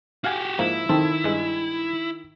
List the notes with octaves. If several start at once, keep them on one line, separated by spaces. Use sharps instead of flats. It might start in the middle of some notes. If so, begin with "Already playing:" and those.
F#4 G4 F5 F#5 G#5
G#2 F3 A#3 E4
D#3 C4 A4
G2 G#3